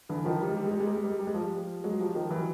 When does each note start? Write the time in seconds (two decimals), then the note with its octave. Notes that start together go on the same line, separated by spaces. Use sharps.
0.09 D3 E3
0.25 D#3 F3
0.41 G3
0.49 G#3
0.57 G3
0.64 G#3
0.71 G3
0.80 G#3
0.87 G3
0.96 G#3
1.04 G3
1.12 G#3
1.19 G3
1.27 G#3
1.34 F3 G3
1.84 F#3 G#3
2.00 F3 G3
2.15 D#3 F3
2.30 E3 F#3